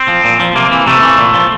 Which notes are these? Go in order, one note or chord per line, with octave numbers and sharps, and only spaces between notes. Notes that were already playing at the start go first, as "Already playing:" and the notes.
Already playing: C4
F3
A#2
F3
C3 A#3
E3
C3 A3
E3
A#2
F3